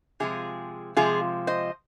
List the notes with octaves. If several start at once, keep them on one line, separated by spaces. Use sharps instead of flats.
C3 F3 G#3 F4 G#4
C3 F3 G#3 F4 G#4
C5 D#5